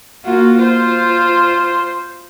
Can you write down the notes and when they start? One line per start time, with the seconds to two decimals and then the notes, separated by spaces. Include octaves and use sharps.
0.25 A#3 F4 F#4
0.58 F4 C5